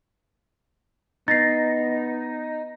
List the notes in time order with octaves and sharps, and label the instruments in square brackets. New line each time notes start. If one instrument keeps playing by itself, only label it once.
[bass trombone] B3 [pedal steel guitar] D#4 [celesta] A6 A#6 C7